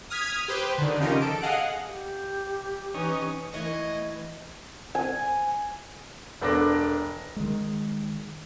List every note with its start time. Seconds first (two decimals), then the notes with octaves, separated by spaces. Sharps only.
0.10 D#6 F6 G#6 B6
0.48 G4 B4 C5
0.78 D3 D#3
1.00 C#3 F3 C#4 D#4 G4 A#4
1.22 A4 D7
1.42 G#4 D#5 F5 F#5 F#6
1.88 G4
2.94 E3 C#4 D#4
3.54 E3 A3 B4 C#5 D#5
4.95 G#5
6.41 E1 B3 D4 A4 D6 A#6
7.36 D#3 G#3